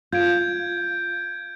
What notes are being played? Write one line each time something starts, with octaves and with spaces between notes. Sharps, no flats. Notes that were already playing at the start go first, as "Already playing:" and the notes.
F4 G6 G#6 D7